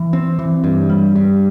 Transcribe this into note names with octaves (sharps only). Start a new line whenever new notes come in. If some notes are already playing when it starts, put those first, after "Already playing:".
Already playing: E3
C4
E3
G2
G3
G2